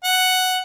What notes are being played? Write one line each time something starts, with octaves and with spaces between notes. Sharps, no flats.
F#5